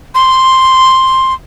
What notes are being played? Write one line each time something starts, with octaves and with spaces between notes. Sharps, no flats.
C6